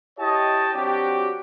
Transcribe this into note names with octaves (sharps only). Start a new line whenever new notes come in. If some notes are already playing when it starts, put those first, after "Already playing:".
E4 G4 C#5 D#5 G5 A5
F#3 C4 D4 F#4 G4